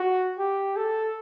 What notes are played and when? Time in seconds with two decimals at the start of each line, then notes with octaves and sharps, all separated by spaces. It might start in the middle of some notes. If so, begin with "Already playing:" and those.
Already playing: F#4
0.38 G4
0.76 A4